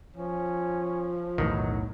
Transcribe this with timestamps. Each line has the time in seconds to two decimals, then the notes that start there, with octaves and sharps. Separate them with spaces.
0.16 F3 C#4
1.38 B1 E2 A2 D#3 F#3